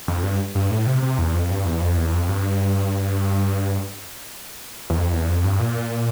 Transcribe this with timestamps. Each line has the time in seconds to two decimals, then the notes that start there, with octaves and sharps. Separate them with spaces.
0.08 F2
0.23 G2
0.55 G2
0.70 A2
0.87 C3
1.02 C3
1.18 E2
1.34 F2
1.50 G2
1.66 E2
1.81 F2
1.97 E2
2.13 F2
2.29 G2
4.90 E2
4.97 F2
5.13 E2
5.29 F2
5.44 G2
5.60 A#2